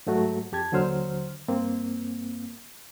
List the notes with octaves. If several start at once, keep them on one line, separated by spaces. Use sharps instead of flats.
G#2 F#3 A3 F#4
F2 G4 A5 G#6
D#2 D3 F#3 C5 F6
G2 A#3 C4